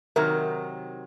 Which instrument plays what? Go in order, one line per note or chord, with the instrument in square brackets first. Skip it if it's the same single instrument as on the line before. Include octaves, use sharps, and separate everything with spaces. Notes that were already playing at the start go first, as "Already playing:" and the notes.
[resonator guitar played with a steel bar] C3 D#3 F#3 [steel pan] A#4 E5